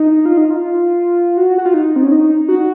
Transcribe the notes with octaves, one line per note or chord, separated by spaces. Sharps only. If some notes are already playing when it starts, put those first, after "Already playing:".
Already playing: D#4
F4
D#4
F4
F#4
F#4
F4
D#4
C4
C#4
D#4
F#4